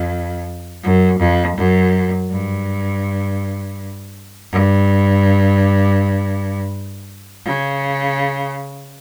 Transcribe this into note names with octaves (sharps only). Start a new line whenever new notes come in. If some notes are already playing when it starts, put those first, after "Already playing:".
Already playing: F2
F#2
F2
F#2
G2
G2
C#3